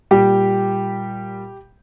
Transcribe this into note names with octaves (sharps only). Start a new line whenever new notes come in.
A#2 G3 G4